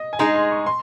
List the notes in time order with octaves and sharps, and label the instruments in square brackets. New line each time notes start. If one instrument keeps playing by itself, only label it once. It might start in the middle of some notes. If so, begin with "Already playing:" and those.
Already playing: [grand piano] D#5
G#5
[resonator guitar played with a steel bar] G#3 D#4 G#4 [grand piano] A#5
[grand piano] C6
C#6
C6